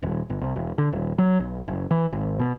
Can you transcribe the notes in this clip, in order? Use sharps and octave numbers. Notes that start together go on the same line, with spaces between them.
D#1
G1
C2
E1
D3
D#1
F#3
B1
F#1
E3
G#1
B2